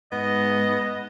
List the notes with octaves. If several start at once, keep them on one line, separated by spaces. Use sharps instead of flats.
G#2 B3 D#5